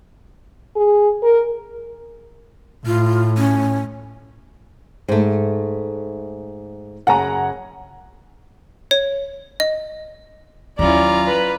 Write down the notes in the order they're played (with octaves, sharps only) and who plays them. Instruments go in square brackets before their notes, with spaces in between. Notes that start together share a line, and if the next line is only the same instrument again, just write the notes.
[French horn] G#4
A#4
[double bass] A2 [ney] F4
[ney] C#4
[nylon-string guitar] G#2 A3
[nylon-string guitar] F#2 C#3 [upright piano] F#5 G#5 A#5
[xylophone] C#5
D#5
[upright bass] D#2 F#3 [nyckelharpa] C#4 E4 [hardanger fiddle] F4 A#5 [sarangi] D5
[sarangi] B4 [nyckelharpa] B5